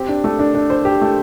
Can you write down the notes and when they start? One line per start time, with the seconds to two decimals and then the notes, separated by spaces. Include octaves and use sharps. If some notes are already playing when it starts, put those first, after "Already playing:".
Already playing: C4 G4
0.09 D4
0.24 A3
0.39 D4
0.55 D4
0.70 C5
0.85 G4
1.01 A3